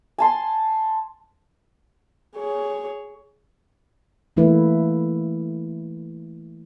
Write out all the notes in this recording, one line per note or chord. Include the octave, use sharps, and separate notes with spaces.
G#5 A5 C6
G#4 C#5
E3 A3 A#3 E4 B4